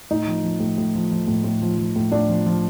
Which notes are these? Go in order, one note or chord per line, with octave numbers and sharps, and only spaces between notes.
A2 D#4
F3
F3
A2
A2
F3
F3
A2
A2
F3
F3
A2
A2 D4
F3
F3